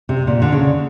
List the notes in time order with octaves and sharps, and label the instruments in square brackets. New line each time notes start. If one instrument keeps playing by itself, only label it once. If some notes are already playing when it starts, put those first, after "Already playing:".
[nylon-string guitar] C3
A#2
D3
C#3